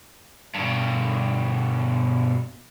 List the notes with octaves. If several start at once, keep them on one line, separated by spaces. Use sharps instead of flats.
G2 B2